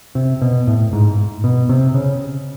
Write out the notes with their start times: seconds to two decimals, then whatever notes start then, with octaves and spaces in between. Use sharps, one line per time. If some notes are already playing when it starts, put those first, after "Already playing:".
0.15 C3
0.42 B2
0.67 A2
0.93 G#2
1.44 B2
1.69 C3
1.94 C#3